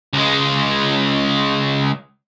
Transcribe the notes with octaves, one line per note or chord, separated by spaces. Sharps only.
C#2 G#3